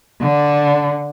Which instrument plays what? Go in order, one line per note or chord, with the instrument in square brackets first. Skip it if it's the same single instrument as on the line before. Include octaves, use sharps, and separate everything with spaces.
[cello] D3